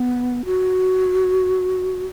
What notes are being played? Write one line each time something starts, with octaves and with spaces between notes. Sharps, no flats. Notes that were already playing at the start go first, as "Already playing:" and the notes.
Already playing: B3
F#4